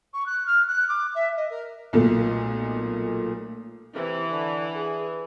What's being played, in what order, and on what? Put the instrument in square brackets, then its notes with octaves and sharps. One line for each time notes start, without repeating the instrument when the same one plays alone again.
[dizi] C#6
F#6
F6
F#6
D6
E5
D#5
A#4
[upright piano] B1 A#2 A3
[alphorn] C3 [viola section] E3
[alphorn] D3
G#4